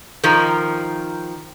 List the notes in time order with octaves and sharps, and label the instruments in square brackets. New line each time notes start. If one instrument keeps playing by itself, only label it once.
[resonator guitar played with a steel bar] D#3 F3 A#4